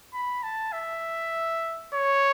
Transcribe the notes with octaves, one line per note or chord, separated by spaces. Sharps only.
B5
A5
E5
C#5